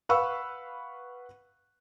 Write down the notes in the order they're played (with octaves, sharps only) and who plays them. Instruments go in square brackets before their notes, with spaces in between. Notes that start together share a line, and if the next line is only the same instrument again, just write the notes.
[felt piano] B4 F5 F#5 B5 C#6 E6